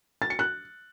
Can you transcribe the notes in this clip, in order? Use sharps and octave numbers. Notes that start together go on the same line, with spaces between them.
A6
C#7
F#6